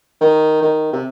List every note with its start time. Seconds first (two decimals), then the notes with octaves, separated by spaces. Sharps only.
0.21 D#3
0.62 D#3
0.93 C3